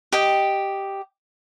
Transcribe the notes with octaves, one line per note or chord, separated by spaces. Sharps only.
G4 D#5 G5